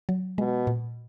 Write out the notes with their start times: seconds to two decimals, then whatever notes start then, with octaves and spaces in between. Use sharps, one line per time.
0.09 F#3
0.38 B2 G#3
0.67 A#2